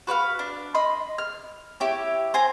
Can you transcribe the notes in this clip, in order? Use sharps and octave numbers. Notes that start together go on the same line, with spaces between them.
F#4 B4 D5 F5
D4
D#5 B5 C6
F6
E4 G4 C#5
C5 G#5 A#5